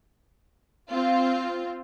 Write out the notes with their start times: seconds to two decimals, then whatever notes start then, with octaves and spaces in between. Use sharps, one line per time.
0.91 C4 F4